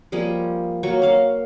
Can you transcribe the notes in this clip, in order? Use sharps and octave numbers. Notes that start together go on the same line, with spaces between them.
F3 G3 A#3 G#4
F#3 A#3 C#6
A#3 F5